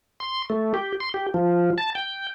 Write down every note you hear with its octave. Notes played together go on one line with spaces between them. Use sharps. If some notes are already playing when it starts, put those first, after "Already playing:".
C6
A3
G4
C6
G4
F3
A5
G5